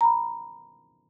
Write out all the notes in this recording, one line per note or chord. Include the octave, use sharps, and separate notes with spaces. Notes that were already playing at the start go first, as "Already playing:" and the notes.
A#5 B5